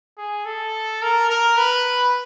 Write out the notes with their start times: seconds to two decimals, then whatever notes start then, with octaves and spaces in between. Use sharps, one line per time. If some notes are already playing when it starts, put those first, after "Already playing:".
0.18 G#4
0.45 A4
1.02 A#4
1.29 A#4
1.57 B4